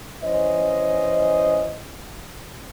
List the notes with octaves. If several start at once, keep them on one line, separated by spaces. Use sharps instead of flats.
E3 C#4 C5 D#5